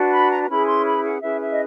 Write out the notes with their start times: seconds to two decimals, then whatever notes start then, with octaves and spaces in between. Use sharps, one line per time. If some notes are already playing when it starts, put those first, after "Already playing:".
Already playing: D4 F#4 B4
0.12 B5
0.31 A#5
0.44 A#5
0.49 C#4 E4 G#4 B4 B5
0.67 C6
0.85 B5
1.04 F#5
1.22 C#4 E4 G#4 B4 E5
1.41 E5
1.51 D#5